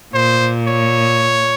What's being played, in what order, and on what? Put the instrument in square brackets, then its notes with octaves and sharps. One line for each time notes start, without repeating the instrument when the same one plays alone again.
[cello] A#2 [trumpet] C5
[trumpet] C#5